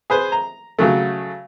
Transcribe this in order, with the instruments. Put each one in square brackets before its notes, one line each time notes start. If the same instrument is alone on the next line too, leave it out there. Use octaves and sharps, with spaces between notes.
[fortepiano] G#4 B4 C5
A#5
C#3 F#3 A3